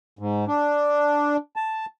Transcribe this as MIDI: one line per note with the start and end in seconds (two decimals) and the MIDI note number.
0.19 0.45 44
0.48 1.37 62
1.56 1.86 81